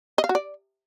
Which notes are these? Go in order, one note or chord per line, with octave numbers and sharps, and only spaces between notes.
D#5
F5
F#4
D5